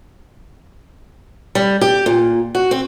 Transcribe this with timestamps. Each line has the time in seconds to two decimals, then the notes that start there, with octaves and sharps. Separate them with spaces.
1.55 G3
1.81 G4
2.06 A#2
2.55 F#4
2.71 C4